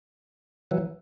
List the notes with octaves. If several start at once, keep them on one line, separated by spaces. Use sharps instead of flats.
E3 F#3